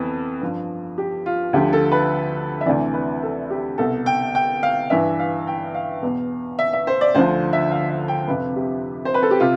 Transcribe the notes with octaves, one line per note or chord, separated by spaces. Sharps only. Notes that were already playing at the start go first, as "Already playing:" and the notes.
Already playing: F2 E3 B3
G2 F3
G4
F4
D2 D3 F3 G4
A4
B4
E5
D2 C3 E3 D5
B4
A4
G4
C2 B2 A4
G5
G5
F5
G2 E3 E5
F5
G5
F5
E2 B2
E5
E5
C5
D5
D2 D3 F3 C5
E5
F5
E5
G5
F2 C3 F3 B4
G4
C5
B4
A4
G4
C3 F4